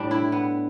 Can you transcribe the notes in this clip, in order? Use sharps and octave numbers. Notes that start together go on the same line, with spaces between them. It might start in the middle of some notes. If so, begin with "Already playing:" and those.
Already playing: A2 G3 D4
E4
B3